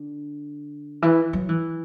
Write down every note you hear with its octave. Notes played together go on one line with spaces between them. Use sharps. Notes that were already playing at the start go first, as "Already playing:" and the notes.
Already playing: D3
E3
F#3
E3